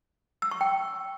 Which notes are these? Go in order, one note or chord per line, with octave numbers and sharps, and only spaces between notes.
E6
C#6
G5